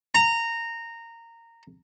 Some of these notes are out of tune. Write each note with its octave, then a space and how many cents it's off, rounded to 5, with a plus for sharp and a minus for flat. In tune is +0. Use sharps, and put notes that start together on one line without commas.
A#5 -15